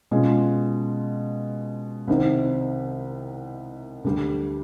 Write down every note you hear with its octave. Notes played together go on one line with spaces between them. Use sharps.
B2 G#3 C#4 F4
C2 C3 D#3
D2 D3 G3